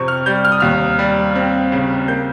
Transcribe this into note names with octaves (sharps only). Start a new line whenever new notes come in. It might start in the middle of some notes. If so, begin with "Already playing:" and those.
Already playing: F2 C3 C#6
F6
G3 G6
F6
D#6
D#2 F6
G3
C4
C#3
A#3 G6